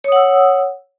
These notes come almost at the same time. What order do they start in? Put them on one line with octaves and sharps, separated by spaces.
C#5 D#6 F#5 E6